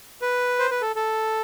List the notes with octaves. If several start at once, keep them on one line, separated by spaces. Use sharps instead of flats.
B4
C5
B4
A4
A4